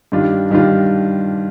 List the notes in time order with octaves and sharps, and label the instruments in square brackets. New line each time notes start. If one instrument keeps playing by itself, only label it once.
[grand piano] G2 D#3 G3 D4 F4
G2 D#3 G3 D4 F4